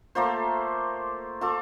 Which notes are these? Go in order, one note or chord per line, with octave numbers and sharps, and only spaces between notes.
A3 A#3 F4 C5
F4 A4 D6